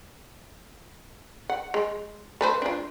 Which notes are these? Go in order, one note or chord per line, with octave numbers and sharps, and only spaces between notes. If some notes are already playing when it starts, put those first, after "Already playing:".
F#5
G#3
A3 B4 C5
D4 F4